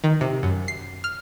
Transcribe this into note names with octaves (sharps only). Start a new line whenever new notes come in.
D#3
C3
F#2
C7
F6